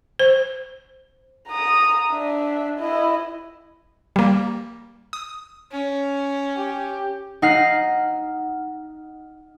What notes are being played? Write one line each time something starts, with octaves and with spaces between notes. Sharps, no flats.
C5
A#5 D#6
D4 E5
E4 D#5
G3 A#3
D#6
C#4
G4
D#4 F#5 F6 A#6 C7